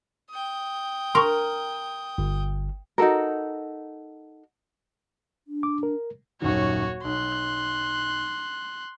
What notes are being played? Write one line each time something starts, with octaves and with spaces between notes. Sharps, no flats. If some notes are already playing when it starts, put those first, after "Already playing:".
G5 D#6
A#4 C6 C#6
G1
D#4 F#4 A4 A#4
D4
D6
A#4
D#1 F#2 D#3 F#4 C#5
B1 C6 F#6